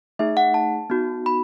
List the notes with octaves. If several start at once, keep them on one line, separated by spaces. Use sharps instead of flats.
A3 D#4 G#4 E5
F#5
A5
B3 D#4 F#4
B5